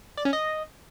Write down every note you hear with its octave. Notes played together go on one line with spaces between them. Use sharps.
D5
C#4
D#5